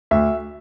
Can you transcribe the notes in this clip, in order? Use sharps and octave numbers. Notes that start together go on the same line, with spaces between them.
D2 E5